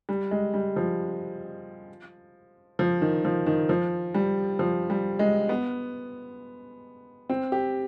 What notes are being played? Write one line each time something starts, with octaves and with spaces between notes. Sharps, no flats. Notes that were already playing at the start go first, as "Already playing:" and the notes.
G3
G#3
G3
F3
F3
D#3
F3
D#3
F3
G3
F3
G3
G#3
B3
C4
G4